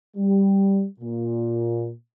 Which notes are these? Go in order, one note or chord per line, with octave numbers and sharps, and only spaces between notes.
G3
A#2